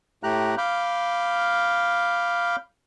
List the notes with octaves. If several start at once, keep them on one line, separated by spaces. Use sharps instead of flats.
A2 A3 G4 A#5 F#6
F5 B5 D6 F6 G6